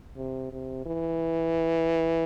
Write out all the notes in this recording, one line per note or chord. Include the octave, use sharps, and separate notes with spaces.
C3
C3
E3